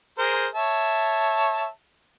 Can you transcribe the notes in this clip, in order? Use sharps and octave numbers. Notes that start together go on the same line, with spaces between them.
G#4 A#4 C5
C#5 E5 A5